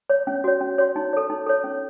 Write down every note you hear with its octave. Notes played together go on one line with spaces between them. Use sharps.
C#5
C#4
F#4 C#5
C#4
F#4 C#5
D#4
A4 C#5
D#4
A4 C#5
C#4